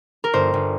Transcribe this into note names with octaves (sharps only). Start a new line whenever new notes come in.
A#4
G1 C5
G1